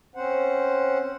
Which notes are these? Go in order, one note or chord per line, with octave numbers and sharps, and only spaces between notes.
C4 C#4 C5 F#5